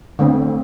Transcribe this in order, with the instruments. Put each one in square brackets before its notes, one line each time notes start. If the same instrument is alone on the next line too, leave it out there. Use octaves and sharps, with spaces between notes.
[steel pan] D3 A3 C4